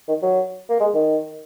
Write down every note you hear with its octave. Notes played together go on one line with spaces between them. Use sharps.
D#3
F#3
A#3
G#3
D#3